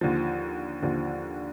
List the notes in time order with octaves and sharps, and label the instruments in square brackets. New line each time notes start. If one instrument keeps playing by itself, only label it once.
[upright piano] D#2 D3 F3
D#2 D3 F3